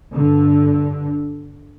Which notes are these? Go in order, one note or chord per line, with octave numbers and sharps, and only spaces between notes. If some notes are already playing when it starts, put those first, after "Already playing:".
G2 D3